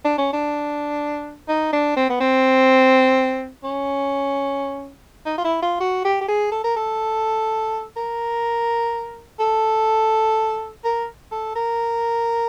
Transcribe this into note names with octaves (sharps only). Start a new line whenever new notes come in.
D4
C#4
D4
D#4
D4
C4
B3
C4
C#4
D#4
F4
E4
F4
F#4
G4
G4
G#4
A4
A#4
A4
A#4
A4
A#4
A4
A#4